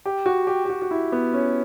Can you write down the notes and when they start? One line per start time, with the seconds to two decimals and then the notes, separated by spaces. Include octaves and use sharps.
0.06 G4
0.26 F#4
0.47 G4
0.65 G4
0.70 F#4
0.82 F#4
0.91 E4
1.12 B3
1.33 C#4